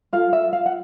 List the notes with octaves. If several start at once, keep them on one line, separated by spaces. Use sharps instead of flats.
F4 A4 F5
E5
F5
F#5